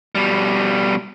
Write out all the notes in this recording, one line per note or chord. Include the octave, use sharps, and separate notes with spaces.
B2 G3